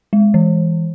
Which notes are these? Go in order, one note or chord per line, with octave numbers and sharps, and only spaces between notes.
G#3
E3